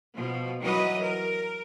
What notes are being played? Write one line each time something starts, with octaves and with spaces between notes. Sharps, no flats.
B2 F3
E3 F#3 B4 D#5
A#4